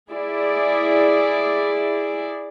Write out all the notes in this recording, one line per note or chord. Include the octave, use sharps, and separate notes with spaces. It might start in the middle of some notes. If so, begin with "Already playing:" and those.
E4 G#4 D5